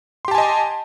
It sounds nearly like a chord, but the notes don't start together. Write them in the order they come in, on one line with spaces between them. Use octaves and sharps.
C6 G4 A5 G#5 D#5